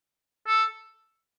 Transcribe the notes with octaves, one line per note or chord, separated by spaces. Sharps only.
A4